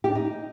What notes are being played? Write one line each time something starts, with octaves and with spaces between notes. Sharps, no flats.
G4
D4
D#4